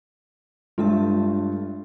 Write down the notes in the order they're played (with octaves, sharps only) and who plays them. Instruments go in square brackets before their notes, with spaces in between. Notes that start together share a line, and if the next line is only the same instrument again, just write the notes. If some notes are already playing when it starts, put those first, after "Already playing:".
[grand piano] G2 A3 F4 [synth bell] G#3 D4 E5